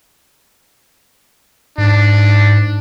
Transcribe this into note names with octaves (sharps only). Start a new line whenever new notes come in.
G#2 D4